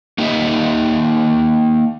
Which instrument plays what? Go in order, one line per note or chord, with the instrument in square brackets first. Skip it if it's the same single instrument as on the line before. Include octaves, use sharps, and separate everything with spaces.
[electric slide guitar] A#3 D#4 G4 D#5 E5